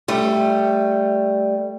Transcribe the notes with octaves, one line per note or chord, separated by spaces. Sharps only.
G3 A3